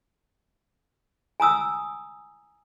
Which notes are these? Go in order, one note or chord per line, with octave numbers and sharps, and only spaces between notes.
G#5 A#5 D#6 E6